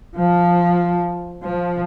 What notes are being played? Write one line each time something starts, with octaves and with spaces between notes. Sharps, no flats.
F3
F3